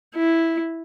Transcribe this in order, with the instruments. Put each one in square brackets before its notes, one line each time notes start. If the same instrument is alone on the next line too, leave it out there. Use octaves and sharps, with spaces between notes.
[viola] E4